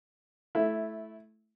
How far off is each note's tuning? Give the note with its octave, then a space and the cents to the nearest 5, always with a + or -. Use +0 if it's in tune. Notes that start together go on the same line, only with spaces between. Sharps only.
A3 -15 E4 +0